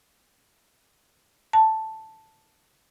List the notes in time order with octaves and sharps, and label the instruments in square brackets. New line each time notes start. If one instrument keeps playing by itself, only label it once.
[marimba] A5